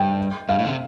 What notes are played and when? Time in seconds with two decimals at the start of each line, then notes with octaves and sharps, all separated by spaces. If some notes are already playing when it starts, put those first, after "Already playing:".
Already playing: G2 G5
0.48 G2 F5
0.59 A2
0.65 D3
0.68 C3